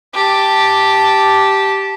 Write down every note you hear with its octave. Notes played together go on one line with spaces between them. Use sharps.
G4 A5